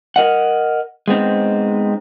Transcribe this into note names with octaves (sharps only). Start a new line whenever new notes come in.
A#4 D#5 F#5
G#3 B3 C4 D#4